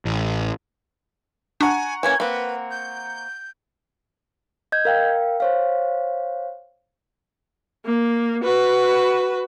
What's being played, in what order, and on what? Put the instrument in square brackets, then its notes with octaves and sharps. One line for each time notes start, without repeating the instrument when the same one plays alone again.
[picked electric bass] A1
[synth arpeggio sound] D4 [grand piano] F#5 A#5 C#6 [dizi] G#5
[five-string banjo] E3 A#3 C#4 [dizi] G#6
[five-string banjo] A#3 C4 [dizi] B4
[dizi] G6
[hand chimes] D#5 G6 G#6
A#4 F5 G5
C5 C#5 F5
[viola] A#3
F#4 B4